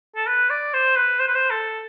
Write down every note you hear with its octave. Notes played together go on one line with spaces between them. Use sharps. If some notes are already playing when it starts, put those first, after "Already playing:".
A4
B4
D5
C5
B4
C5
B4
C5
A4